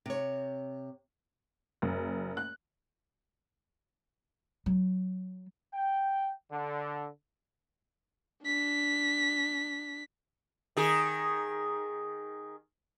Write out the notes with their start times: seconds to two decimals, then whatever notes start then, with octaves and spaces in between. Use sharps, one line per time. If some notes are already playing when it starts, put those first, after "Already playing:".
0.06 C3 C#5
1.82 F#1
2.37 F#6
4.66 F#3
5.74 G5
6.52 D3
8.44 D4 B6
10.77 D#3 G#4